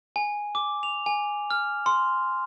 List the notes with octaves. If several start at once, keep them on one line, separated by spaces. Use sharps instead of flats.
G#5
D6
F7
G#5
F6
C6